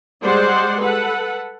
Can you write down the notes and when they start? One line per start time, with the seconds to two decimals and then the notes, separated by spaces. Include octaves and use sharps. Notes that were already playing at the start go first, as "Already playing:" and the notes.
0.24 G3 G#3 C5 D5 F#5 C6
0.82 A4 B4 F#5